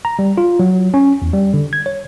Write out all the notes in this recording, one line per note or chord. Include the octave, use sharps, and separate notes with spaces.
A#5
G3
F4
F#3
C#4
E2
G3
D3
G#6
C#5